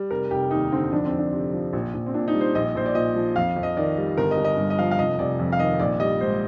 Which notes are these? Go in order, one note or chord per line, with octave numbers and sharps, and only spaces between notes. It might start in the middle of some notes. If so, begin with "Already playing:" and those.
Already playing: G3
F1 A#4
F1 G4
D#2 D#4
D3 C4
F2 D4
C4
F2
D4
C3
F3
A#1
A#1
C4
A#2 D4
D#4
G3
C5
A#1 D#5
A#1 C5
D5
A#2 D#5
F3
F2 F5
F2
D#5
D#3 D5
G3
G1 A#4
D#5
G1
D#5
G2
D#5
F3 F5
F5
F1 D#5
F1 D5
F2
F5
D#3 D#5
A#1 D5
G3 D#5
G#2 C5